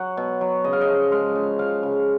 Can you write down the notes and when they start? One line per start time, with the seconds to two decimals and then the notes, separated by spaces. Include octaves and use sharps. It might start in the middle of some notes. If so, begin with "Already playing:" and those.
Already playing: F#3 F#5
0.17 B2
0.41 F#3
0.64 C#3 D#5
0.73 F5
0.81 D#5
0.88 F3
1.12 G#3 F5
1.35 C#3
1.59 F3 F5
1.83 C#3